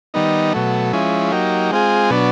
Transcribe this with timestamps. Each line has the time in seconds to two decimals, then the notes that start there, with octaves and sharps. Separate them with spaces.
0.14 D#3 G3 B3 D#4
0.53 B2 F#3 A3
0.93 F3 G#3 C#4 E4
1.32 F#3 A#3 D#4 G4
1.71 G#3 C4 F4 G#4
2.10 B2 F#3 B3 D4